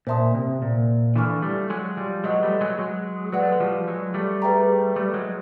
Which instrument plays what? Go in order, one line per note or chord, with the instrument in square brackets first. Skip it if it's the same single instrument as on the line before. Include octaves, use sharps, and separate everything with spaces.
[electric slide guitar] A#2 [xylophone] C5 E5 A5 C6 D#6
[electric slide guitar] C3
A#2
[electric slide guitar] D3 E3 [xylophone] F5 G#5 C#6 F6
[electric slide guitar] G3 A3
F#3 G#3
F3 G3
[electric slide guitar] F#3 G#3 [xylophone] B4 D#5 F#5 A5
[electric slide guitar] G3 A3
F#3 G#3
F#3 G#3
[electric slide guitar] F#3 G#3 [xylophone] B4 D5 F#5
[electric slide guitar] A3
G#3
F3 G3
F#3 G#3
G3 A3
[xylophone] G#4 B4 E5 G5 A#5
[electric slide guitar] G3 A3
F#3 G#3